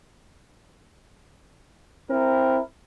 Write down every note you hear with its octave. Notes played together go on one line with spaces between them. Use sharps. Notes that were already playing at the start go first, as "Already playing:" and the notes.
C4 E4 A#4